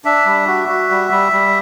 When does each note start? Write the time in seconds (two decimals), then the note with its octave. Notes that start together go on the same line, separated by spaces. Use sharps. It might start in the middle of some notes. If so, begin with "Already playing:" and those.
0.05 D4 E5
0.26 G3
0.47 F#4
0.68 F#4
0.90 G3
1.11 G3
1.32 G3